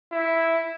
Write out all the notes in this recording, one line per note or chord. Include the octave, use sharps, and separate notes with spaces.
E4